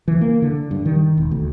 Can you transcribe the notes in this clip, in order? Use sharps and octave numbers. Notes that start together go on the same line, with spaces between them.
E3
A#3
D3
G2
D#3
E1
D2